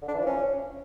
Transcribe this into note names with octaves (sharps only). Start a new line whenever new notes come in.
D3
D4
E3
F3
C#4